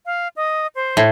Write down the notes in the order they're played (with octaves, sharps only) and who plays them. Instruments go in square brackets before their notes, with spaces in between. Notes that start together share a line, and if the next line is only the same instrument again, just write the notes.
[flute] F5
D#5
C5
[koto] A2